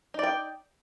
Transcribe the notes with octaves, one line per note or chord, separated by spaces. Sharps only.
D#4 D5 G5